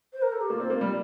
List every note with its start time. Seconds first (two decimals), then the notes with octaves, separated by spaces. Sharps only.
0.13 C5
0.22 A#4
0.32 A4
0.41 G4
0.50 A#3 F4
0.60 C4
0.70 A#3
0.81 G3